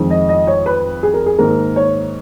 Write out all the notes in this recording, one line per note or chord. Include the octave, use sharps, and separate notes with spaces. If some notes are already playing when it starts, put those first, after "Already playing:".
Already playing: F2 D#3 G#3
D#5
D#5
C#5
B4
G#4
A#4
G#4
G#2 D#3 A#3 A#4
C#5